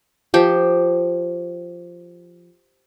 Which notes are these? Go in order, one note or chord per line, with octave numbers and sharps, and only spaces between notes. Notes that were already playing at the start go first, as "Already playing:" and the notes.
F3 G4